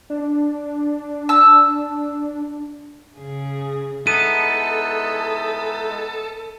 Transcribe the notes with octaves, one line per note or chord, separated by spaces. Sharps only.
D4
A5 E6
C#3 G#4
G#3 B3 D#4 E4 A4 D#7